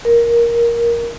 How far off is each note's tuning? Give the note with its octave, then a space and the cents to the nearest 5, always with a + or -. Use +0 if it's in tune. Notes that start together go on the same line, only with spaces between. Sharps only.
A#4 +10